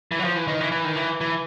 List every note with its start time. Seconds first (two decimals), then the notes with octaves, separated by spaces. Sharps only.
0.12 E3
0.19 F#3
0.24 F3
0.35 E3
0.47 D#3
0.60 E3
0.72 E3
0.85 D#3
0.96 E3
1.21 E3